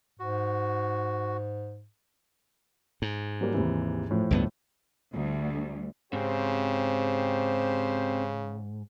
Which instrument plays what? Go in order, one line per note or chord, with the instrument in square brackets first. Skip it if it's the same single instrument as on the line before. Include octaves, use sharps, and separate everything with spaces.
[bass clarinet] G#2 [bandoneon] F#4
[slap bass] G#2
[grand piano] F#3 G3 A#3
D#2 C3 E3
A2 F3
[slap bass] C#2 G2 B3
[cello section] D2 G3
[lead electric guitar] G#2 [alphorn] C#3 [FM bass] C4 [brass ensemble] G4 C5